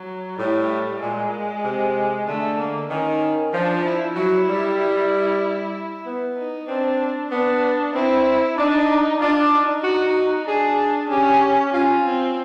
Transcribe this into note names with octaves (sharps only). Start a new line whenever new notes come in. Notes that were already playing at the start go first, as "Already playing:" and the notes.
Already playing: F#3
A2 G3
A#2 G#3
C3
D3 A3
A#3
D#3 C#4
F3 D4
E4
F#3 E4
G3
B3
D#4
C4 D4
B3 D4
C4 E4
D4 D#4
D4 F4
D#4
F#4
D4 G#4
C#4 G4
C#4 F4
C4